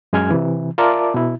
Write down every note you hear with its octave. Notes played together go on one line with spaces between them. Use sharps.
F#2 G#3 G#5 F6 G#6
C3 E3
F4 A#4 D5 E5 A5 D6
B2 E4